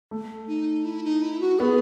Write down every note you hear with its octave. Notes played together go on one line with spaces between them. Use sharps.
A3
D#4
E4
D#4
E4
F#4
B3 G#4 B4